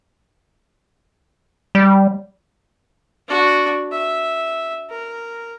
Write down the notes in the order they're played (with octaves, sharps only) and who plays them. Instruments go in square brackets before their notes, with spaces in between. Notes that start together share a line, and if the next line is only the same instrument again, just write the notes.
[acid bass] G3
[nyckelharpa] D4 F#4
E5
A#4